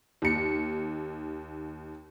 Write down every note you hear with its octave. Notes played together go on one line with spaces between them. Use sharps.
D#2 C#7